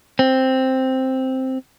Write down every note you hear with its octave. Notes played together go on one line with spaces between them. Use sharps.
C4